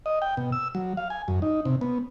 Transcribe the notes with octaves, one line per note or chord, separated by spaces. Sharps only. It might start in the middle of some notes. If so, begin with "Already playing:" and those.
D#5
G5
B2
E6
F#3
F5
G#5
F#2
D#4
C3
B3